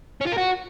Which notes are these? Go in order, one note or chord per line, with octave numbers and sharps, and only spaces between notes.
C#4
F4
A#4
F#4